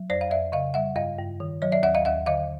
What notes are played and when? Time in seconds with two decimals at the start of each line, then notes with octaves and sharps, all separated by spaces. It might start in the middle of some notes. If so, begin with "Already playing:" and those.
Already playing: F#3
0.10 F2 C5 D5
0.21 F5
0.30 F2 D5 E5
0.52 C#3 D#5 F5
0.74 G3 E5 F#5
0.96 G2 D#5 F5
1.18 G2
1.40 D#3
1.62 F#3 C#5 D#5
1.72 D5 E5
1.83 D#2 E5 F#5
1.95 D#5 F5
2.05 D#2 E5 F#5
2.26 D3 D#5 F5